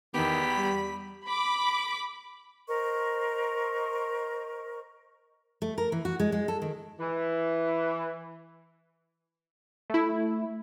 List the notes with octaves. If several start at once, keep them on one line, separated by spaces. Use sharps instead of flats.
E2 D#3 B3 G4 B5
G3
B5 D6
A#4 C5 D#5 C#6
A3
A#4
E3
F#4
G#3
G#3
A4
D#3
E3
A3 E4